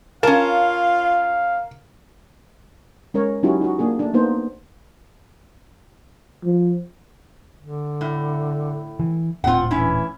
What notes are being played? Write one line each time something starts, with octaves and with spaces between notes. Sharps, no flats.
C#4 F4 A#4 F5 A5
G#3 C#4 A#4 C#5
F#3 C#4 D#4 E4 F#4 G4
D#4 F#4
A#3 D4 G#4
A3 D4
A#3 B3 D#4 C5
F3
D3
A2
E3
D#1 A2 C4 F4 F#5
E3 C#4 E4